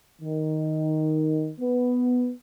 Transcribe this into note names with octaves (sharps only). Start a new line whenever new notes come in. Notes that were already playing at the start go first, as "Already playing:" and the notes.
D#3
B3